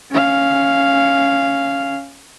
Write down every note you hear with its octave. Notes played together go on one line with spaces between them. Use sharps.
C#4 F5